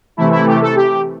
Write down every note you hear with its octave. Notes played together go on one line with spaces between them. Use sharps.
C3 E3 A3 E4
E4
G4
A4
G4